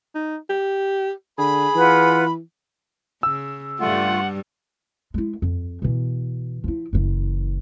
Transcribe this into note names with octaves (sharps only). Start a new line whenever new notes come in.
D#4
G4
D3 G#4 B5
E3 F4 B4 F#5
C#3 E6
G2 G3 A3 F4 F#5
G#3 E4
F2
B2 E3
F3 E4
F#1 E3